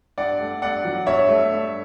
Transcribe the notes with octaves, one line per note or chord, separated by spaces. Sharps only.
G2 D5 F#5
A3
G2 D5 F#5
F#3
G2 C#5 E5
A3
G2